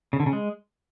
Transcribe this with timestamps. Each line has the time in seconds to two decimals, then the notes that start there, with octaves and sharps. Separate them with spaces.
0.13 C#3
0.20 D3
0.26 C#3
0.33 G#3